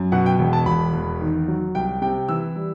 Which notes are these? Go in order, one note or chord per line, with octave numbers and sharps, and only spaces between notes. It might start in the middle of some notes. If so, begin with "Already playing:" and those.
Already playing: F#2
B2 F#5
G5
E1
A5
E1 B5
E2
D#3
F#3
C2 G5
C3 G5
E3 E6
G3